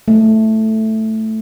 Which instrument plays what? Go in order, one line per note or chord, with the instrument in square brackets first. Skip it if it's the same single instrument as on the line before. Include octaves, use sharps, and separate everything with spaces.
[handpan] A3